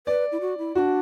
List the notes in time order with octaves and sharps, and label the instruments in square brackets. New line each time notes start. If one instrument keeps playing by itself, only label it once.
[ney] B4 [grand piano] D5
[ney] E4
F#4
E4
[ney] D4 E4 [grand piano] F#4